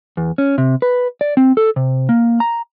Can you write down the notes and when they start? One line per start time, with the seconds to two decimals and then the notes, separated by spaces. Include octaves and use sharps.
0.17 E2
0.38 C#4
0.58 C3
0.82 B4
1.21 D5
1.37 C4
1.57 A4
1.76 C3
2.09 A#3
2.40 A#5